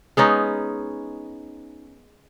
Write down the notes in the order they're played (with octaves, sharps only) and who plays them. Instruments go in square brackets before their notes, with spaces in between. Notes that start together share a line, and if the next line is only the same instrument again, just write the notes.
[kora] G#3 B3 C#4 D#4